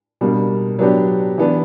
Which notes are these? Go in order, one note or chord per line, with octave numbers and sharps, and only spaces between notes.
B2 G3 A#3 D4
F#3 B3 D4 G4
E3 B3 D4